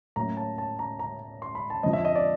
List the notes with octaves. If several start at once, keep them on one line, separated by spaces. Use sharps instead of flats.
A2 F#3 A#3 C#4 A#5
A5
A5
A#5
A#5
C6
B5
A5
F2 D3 F3 D#5
E5
D#5
D5